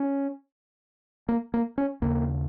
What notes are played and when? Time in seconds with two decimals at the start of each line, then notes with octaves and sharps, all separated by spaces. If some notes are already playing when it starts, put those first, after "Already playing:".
Already playing: C#4
1.29 A#3
1.54 A#3
1.78 C#4
2.02 D#2 C#3 A#3